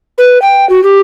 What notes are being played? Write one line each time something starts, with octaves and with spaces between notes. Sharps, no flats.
B4
G5
F#4
G4